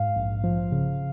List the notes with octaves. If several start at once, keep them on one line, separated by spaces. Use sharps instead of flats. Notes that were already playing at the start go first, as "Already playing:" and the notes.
Already playing: G#2 F5
A#1
F3
C#3